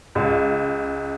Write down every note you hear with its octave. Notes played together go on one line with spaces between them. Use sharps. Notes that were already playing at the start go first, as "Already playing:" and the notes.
C#2